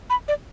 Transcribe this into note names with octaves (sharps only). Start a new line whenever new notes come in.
B5
D5